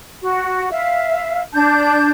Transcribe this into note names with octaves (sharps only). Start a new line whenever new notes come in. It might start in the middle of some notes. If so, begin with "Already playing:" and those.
F#4
E5 F5
D4 A5 G6